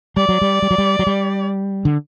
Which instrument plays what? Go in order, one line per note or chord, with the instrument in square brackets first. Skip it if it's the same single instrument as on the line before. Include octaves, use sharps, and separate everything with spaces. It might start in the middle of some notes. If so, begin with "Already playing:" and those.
[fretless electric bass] G3 [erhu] D5
[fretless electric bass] F#3
G3
G3
F#3
G3
F#3
G3
D3